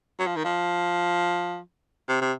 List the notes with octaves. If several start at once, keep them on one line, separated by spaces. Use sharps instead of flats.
F#3
F3
D#3
F3
C3
C3